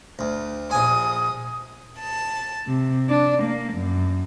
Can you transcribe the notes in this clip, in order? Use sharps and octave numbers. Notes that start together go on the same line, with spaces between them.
D2
A#1 G#5 D#6
A5
C3
D4
A#3
F#2